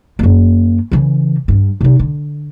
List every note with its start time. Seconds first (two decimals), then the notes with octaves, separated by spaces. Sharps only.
0.19 F#2 A#3
0.91 C#3 E3
1.48 G2
1.81 C3 D#4
1.99 D3